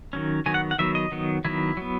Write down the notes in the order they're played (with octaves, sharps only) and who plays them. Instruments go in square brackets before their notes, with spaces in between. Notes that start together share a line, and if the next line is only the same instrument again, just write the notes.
[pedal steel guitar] D#3 F#3 C#4
D#3 F#3 B3 G#5
F#5
F#5
D#3 F#3 B3 E5
D#5
D#3 F#3 B3
D#3 F#3 B3 E4
F#3 B3